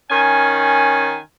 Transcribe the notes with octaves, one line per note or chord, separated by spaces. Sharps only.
D#3 C#4 G#5